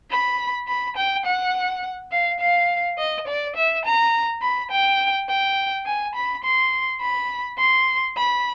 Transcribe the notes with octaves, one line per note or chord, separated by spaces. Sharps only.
B5
B5
G5
F#5
F5
F5
D#5
D5
E5
A#5
B5
G5
G5
G#5
B5
C6
B5
C6
B5